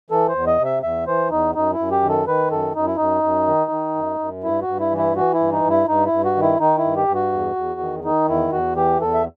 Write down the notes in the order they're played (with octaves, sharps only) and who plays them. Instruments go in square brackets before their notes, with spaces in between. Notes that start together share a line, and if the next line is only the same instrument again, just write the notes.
[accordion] E3 A4
C5
E2
D#5
C3
E5
E2 E5
E3 C5
E2 D#4
F#2 D#4
E4
F#2
G4
D#3
A4
D#3 B4
F#2 A4
F#2 D#4
E4
F#2 D#4
F#2
D#3
D#3
F#2
F#2
G2 E4
F#4
G2
E4
E3
E4
E3 F#4
E4
G2
D#4
G2
E4
G2 D#4
E4
G2
F#4
D#3
E4
D#3 D#4
E4
G2
G4
G2
F#4
E2
E2
D#3
D#3 D#4
E2 E4
E2 F#4
E3 G4
E2 A4
E5